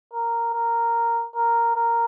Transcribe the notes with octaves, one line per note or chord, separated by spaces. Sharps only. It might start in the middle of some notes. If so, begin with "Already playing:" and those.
A#4
A#4
A#4
A#4